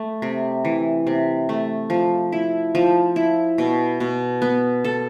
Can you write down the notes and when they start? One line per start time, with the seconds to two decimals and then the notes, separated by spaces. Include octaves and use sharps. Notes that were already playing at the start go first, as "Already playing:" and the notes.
Already playing: A3
0.22 C3
0.65 E3
1.07 C3
1.49 A3
1.90 F3
2.32 E4
2.75 F3
3.16 E4
3.58 B2
4.00 B2
4.42 B3
4.84 A4